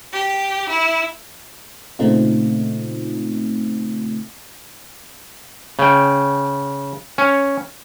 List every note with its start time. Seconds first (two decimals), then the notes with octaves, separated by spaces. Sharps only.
0.13 G4
0.69 E4
1.99 A#2 C#3 A3 C4 D#4 F4
5.79 C#3 G5
7.18 C#4